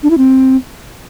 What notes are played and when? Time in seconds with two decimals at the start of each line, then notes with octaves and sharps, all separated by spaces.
0.03 D4
0.10 E4
0.18 C4